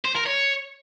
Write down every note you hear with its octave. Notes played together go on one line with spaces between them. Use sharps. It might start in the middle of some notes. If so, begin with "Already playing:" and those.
C5
A#4
C#5